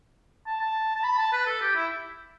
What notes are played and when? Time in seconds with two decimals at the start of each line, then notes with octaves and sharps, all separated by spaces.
0.46 A5
0.61 A5
0.95 A5
1.04 B5
1.18 A5
1.33 B4
1.47 A4
1.61 G4
1.76 E4